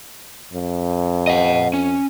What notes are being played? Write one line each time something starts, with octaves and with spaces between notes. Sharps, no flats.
F2
D#5 F#5
C#4